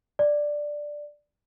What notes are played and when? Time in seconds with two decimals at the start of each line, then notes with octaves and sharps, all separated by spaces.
0.19 D5